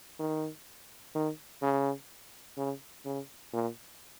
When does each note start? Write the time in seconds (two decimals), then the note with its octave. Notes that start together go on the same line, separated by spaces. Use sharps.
0.19 D#3
1.15 D#3
1.62 C#3
2.57 C#3
3.05 C#3
3.53 A#2